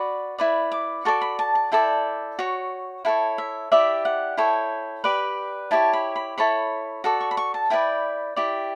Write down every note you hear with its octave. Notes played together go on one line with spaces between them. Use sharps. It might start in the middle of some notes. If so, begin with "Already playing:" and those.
Already playing: F#4 B4 D5
E4 B4 D5
D6
F#4 A4 D5 C#6
B5
A5
A5
E4 A4 D5 G5
F#4 C#5
E4 A4 C#5 F#5
E5
E4 G4 D5 E5
F#5
E4 A4 C#5 G5
G4 B4 D5
E4 G4 C#5 A5
B5
B5
E4 A4 C#5 B5
F#4 A4 D5
C#6
B5
C#6
A5
E4 B4 D5 G5
E4 G4 D5